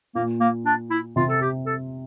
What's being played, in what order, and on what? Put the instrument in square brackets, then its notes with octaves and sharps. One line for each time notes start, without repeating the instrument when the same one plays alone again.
[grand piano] A#2 [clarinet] A#3
[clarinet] A#3
D4
E4
[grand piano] C3 [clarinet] F4
[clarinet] A4
G4
A4